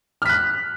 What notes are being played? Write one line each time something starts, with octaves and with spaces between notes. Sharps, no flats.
F6 F#6 B6